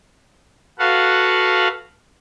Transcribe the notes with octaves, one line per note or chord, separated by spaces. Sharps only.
F#4 A4 B4 F5 F#5